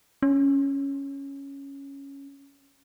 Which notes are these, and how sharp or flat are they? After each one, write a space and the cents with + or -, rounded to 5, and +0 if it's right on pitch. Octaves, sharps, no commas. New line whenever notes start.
C#4 +0